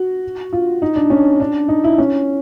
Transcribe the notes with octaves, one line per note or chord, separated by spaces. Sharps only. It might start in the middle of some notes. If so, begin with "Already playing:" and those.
Already playing: F#4
F4
D#4
D4
C#4
D4
D#4
E4
C#4